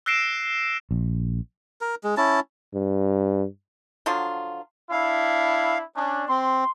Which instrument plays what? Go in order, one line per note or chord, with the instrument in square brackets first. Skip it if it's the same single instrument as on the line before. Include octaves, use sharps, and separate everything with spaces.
[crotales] E6 F#6 A#6 C7 D7 E7
[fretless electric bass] A#1
[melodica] A#4
G#3
C#4 E4 A5
[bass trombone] G2
[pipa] D3 F3 F#3 F4
[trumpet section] D4 E4 [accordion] F5
[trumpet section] C#4 D4
[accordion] C4 [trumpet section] C6